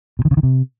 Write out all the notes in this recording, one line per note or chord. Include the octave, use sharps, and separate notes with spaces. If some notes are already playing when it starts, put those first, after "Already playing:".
B2
D#3
C#3
D#3
C3